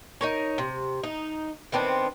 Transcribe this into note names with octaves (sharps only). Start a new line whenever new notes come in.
D#4 A#4 C#5
C3
D#4
D#3 B3 C4 D4